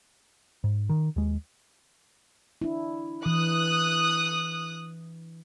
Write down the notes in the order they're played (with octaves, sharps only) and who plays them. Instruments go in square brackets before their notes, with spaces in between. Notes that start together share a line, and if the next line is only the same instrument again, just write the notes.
[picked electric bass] G#2
D#3
D#2 G#3
[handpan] D4 E4
[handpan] E3 [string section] D#6 F#6